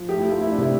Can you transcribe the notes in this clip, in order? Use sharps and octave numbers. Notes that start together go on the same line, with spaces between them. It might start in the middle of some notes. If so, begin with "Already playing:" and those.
Already playing: F3
A3 G4
E4
A3
F4
A3 E4
D4
C3 E4